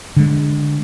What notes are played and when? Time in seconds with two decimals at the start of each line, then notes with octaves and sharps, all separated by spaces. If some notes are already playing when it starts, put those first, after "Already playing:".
0.16 D3 G#3